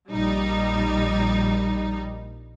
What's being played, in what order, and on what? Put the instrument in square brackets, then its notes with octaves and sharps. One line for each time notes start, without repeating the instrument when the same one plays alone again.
[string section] A#1 G3 D#4